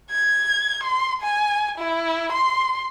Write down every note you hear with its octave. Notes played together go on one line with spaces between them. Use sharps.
G#6
C6
G#5
E4
C6